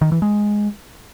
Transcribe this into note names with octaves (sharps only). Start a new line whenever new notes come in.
D#3
E3
G#3